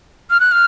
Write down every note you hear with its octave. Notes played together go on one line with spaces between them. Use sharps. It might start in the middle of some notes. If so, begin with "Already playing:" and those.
F6
F#6
F6